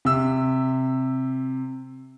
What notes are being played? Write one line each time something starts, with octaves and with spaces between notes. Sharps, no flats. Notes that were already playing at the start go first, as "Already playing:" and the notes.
C3 E6